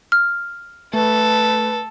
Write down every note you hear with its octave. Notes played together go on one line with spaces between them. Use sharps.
F6
A3 A4 B4